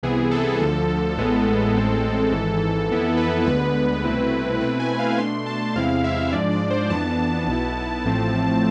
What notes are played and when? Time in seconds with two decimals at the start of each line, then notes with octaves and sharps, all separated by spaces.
0.03 C2 C3 E3 B3 E4 G#4
0.31 A4
0.60 D2 D3 F3 A4
1.17 A1 A2 G#3 B3
1.75 A1 A2 G#3 C4
2.32 G#1 G#2 E3
2.89 F2 E3 B3 E4
3.17 B4
3.46 D2 D3 G#3 B3 B4
4.04 C2 B2 A3 C4 E4
4.61 B2 A3 C4 E4 B4
4.80 G#5
4.99 F5
5.18 B2 A3 D4 C6
5.46 A5
5.75 E2 C3 G#3 C4 E4 F5
6.04 E5
6.32 G#2 F3 G#3 D4 D5
6.51 D5
6.70 C5
6.89 F2 E3 B3 D4 A5
7.47 B1 B2 B3 E4
8.04 A1 A2 F3 A3 C4